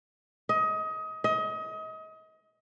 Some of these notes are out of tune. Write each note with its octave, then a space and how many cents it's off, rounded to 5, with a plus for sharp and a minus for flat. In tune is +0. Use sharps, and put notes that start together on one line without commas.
D#5 +25
D#5 +30